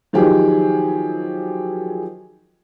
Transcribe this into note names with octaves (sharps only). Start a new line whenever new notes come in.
D#3 F3 F#3 D#4 G4 G#4